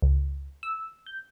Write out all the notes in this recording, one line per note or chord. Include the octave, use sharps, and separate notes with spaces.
C#2
E6
G6